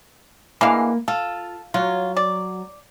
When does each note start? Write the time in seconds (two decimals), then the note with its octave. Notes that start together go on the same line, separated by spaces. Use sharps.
0.61 D3 E3 G#3 A#3 F5
1.08 F4 A4
1.74 F#3 F4
2.17 D5